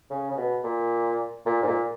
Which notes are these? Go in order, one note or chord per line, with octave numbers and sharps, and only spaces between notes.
C#3
C#3
B2
A#2
A#2
G#2
A#2